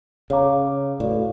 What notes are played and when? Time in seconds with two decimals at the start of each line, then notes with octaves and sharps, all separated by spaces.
0.30 C#3 G#4 C#5 F5 A#5 D6
1.00 A2 F#4 B4 D5 F5